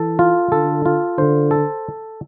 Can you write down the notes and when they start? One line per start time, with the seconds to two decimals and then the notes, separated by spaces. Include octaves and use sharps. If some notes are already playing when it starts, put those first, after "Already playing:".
Already playing: E3 A4
0.19 F4
0.52 D3 A4
0.86 F4
1.18 D3 C5
1.51 A4